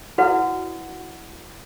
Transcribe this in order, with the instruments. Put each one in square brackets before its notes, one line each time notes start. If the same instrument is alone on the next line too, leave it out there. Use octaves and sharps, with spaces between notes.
[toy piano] E4 F#4 B4 D5 F#5